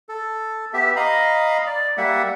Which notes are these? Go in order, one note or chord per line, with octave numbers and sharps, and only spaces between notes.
A4
B3 G4 E5
D#5 F5 A#5 B5
D5
G3 A#3 E5 F#5